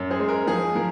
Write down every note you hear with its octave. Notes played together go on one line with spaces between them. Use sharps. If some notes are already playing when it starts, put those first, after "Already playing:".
Already playing: F#2
G#4 C5
G#3
A#4
F3 G#4
F3 A#4